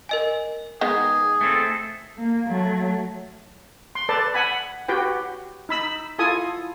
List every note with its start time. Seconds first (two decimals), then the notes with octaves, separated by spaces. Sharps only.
0.09 A#4 D#5 G#5
0.81 D#3 G#3 B3 G#4
1.41 A3 C4 A4
2.18 A#3
2.48 F#3 A3
3.95 C6
4.09 A4 B4 D5 A5
4.34 F#5 G#5 B5
4.88 F#4 G4 B4 G5
5.69 D#4 B5 E6
6.19 E4 F4 A4 G#5 D#6